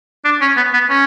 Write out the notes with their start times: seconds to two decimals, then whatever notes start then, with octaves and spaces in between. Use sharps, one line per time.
0.25 D4
0.41 C#4
0.57 B3
0.73 B3
0.90 C#4